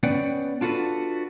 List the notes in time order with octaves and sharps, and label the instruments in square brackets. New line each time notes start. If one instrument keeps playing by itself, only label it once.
[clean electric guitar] B3 C#4 B4 D5 F#5 G5
D4 F4 F#4 A4 B4